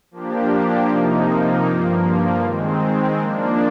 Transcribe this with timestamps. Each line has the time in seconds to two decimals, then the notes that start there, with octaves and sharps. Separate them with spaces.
0.11 F3 A#3 D4 G4
0.88 C3 F3 A#3 D#4
1.65 G2 F3 A#3
2.42 D#3 G#3 C4
3.19 F3 A#3 D4